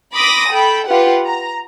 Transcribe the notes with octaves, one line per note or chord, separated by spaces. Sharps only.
B5 C6 D6 D#6 A#6
A4 G5 B5
F4 G4 B4 F#5
A#5